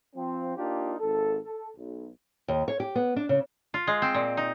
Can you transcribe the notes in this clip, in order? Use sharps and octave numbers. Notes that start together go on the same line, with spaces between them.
F3 C4
A#3 D4 D#4 F4 G4
G#1 A4
A4
B1
D#2
C#5
G4
B3
D4
C#3
F4
G#3
C4
A#2
D#4